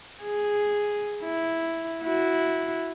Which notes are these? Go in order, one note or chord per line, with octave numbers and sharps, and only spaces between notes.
G#4
E4
E4 F#4